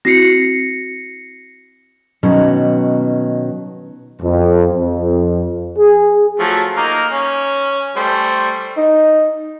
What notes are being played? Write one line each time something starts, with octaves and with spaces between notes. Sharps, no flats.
C4 E4 F#4 A#6 C7 C#7
B2 D#3 F#3 C#4
F2
F2
G#4
F3 F#3 A3
A#3 D#4 A#4
C#4
G3 A3 C5
D#4